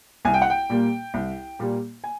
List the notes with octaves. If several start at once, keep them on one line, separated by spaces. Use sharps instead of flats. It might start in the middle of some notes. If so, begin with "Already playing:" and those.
C2 G#5
G5
F#5
G5
A#2 G3 A#3
C2
A#2 G3 A#3
G#5